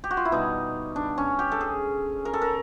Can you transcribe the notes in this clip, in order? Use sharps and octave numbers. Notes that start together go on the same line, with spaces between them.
G4
F#4
F4
E4
B2 G3 D#4
D4
C#4
G4
A4
G#4
A#4
A4
A#4